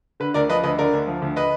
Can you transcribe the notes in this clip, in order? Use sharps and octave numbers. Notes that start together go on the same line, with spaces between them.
D3 B4
D2 A#4 D5
F3 B4 D#5
D2 B4 D#5
D3 A#4 D5
D2
F3
D2
B4 D#5